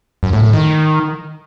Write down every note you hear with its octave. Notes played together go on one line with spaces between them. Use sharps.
F#2
A2
A2
D#3